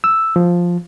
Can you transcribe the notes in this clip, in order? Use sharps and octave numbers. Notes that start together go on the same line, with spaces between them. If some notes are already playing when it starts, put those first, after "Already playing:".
E6
F3